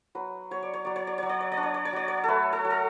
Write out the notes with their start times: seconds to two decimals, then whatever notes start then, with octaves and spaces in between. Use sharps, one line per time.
0.15 F#3 B4
0.51 F#3 C#5
0.63 D5
0.74 C#5
0.85 F#3 D5
0.96 C#5
1.07 D5
1.18 F#3 C#5
1.29 D5
1.41 C#5
1.52 D5
1.57 D4
1.63 C#5
1.74 D5
1.85 C#5
1.93 F#3 D5
2.08 C#5
2.24 A3 A4 B4
2.53 A4
2.65 F#3
2.70 A4